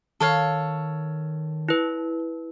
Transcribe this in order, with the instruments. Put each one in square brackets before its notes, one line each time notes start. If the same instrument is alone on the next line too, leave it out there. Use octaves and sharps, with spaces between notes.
[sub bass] D#3 [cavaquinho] A4 C#5 F5
[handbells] E4 B4